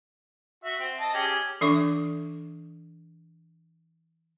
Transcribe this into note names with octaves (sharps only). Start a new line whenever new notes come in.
F#4 E5
C4
D#5 A5
C#4 G4 G#4
E3 D4 A4 E5 C#6 D6